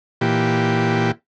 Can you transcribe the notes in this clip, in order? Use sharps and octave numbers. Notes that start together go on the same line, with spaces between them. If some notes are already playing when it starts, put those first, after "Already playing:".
A#2 E3 G4